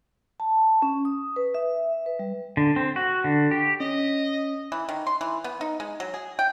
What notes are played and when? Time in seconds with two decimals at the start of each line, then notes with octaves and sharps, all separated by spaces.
0.40 A5
0.82 C#4
1.05 D#6
1.36 B4
1.55 E5
2.06 B4
2.19 G3
2.57 D3
2.76 C4
2.96 F#4
3.24 D3
3.51 G4
3.80 C#4 D#5
4.72 E3
4.89 D#3
5.07 C6
5.21 E3
5.44 B3
5.61 D#4
5.80 G#3
6.00 F#3
6.14 G#4
6.39 G5